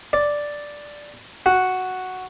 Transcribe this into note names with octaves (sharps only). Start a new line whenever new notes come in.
D5
F#4